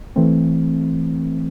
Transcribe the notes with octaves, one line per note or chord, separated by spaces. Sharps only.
E3 A3 C4